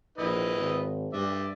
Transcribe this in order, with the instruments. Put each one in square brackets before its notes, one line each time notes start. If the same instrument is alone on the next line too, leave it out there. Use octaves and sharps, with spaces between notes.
[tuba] A#1 [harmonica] E4 B4 D#5
[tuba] G#1
[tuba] G2 [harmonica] D5 E5